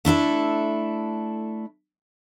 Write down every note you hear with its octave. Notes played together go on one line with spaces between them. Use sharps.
A3 D4 E4 A4